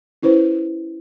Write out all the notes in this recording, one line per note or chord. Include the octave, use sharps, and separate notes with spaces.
C#4 E4 B4 C5